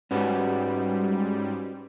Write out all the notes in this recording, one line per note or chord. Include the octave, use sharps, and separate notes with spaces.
G#2 G3 C#4 F#4 B4